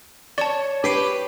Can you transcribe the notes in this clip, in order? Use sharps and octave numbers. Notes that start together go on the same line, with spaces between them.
C#5 D5 A5
D4 G4 B4 C7 D7